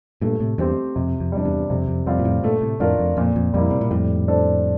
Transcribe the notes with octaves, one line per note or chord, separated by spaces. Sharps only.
G2 A#2 A3
A2 C3
E2 G2 C4 G4 C5
F2 C3
F2
F2 G3 D4
E2 G2
F2 C3
F2
F2 G3 C4 F4
A#2
F2 A2
G2 A#2 A3
A2 C3
F2 A2 D4 F4 A#4
F2
F2 A#2
F2
F2 G3 A#3 E4
C3
A#2
F2 A2 G3
D4 A4 C5